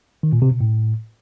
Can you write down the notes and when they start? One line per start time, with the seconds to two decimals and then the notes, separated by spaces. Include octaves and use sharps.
0.23 D#3
0.33 A#2
0.42 C3
0.51 B2
0.61 A2